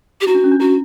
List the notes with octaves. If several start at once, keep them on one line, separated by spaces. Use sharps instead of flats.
G4
E4 F#4
D4
C#4
D4
E4 F#4